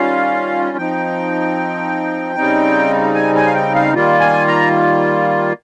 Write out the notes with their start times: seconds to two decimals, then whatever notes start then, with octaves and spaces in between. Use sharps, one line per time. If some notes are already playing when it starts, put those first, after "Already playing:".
Already playing: D#3 G3 C#4 F4 F5
0.77 F3 C4 D#4 G5
2.36 C#3 G3 C4 D#4
3.15 G#5
3.36 G#5
3.46 F5
3.55 G5
3.75 F5
3.94 D#3 G3 A#3 F4
4.20 G#5
4.47 A#5